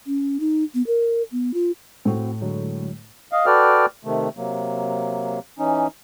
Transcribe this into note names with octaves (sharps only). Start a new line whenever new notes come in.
C#4
D#4
B3
A#4
B3
F4
A2 C4 F#4
D3 F#3 G#3
D#5 F5
F#4 A4 B4 D5 G5 F6
C3 D#3 A3
C3 F#3 A#3
E3 C#4 D#4